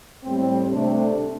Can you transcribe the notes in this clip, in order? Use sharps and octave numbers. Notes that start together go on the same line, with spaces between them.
A2 G3 C4
C3 A3 D4